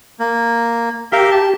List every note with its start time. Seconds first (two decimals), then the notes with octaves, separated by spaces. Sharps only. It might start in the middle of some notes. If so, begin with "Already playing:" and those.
0.20 A#3
1.12 G4 A#4 E5 F5
1.31 A5